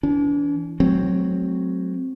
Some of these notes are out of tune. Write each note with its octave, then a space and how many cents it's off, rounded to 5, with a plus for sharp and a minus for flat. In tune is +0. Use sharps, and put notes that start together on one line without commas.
E3 +0 D4 -40
F#3 +0 A3 -30 C4 +0